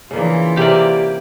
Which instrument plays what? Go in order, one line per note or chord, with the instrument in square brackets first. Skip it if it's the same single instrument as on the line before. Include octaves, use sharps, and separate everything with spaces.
[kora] C#3 A#3 D4 [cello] E3 F4
[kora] C3 A#3 C#4 [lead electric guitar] G4 D5